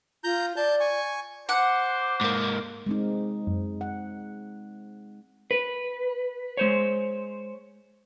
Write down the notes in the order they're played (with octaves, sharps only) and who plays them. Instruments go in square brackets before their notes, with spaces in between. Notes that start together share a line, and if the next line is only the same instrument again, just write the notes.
[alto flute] F4 [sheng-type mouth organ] A#5 G6
[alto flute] D5 [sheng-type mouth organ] A5 G6
[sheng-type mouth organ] G#5 C#6
[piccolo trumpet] C5 [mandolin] F#5 [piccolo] D6
[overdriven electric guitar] G#2 A#3
[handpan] G#3 C4 D#4
[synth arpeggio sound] F#2
[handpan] F#5
[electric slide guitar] B4
G#3 C5 C#5